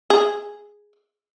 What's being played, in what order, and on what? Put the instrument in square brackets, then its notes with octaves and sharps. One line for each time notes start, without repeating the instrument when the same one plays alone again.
[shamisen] G#4